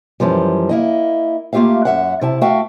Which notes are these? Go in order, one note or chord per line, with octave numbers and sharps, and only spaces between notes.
F#2 E3 F3 G3
A#3 E4 D#5
A3 A#3 F4 G4 E5 F5
F#2 E5 F#5
C3 E4 A5
A3 F#4 E5 F5 G5